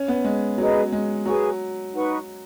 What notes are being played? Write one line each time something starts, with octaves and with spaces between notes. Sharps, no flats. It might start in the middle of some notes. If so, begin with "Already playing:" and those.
Already playing: C#4
B3
G#3
F#3 D#4 G#4 B4 D#5
G#3
F#3 G#4 B4 G#5 C#6
D#4 B4 F#5 C#6